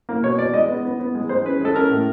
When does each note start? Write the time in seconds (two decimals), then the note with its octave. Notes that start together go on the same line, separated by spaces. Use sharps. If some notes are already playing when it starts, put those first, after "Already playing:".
0.09 A#3
0.23 B2 C#5
0.38 B2 D5
0.53 G#3 D#5
0.68 B3
0.85 B3
1.00 B3
1.15 G#3
1.29 G#3 C5
1.44 C#4 B4
1.61 G#3 A4
1.75 C#4 A#4
1.90 A2